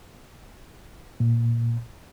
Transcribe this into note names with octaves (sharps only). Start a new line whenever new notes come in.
A#2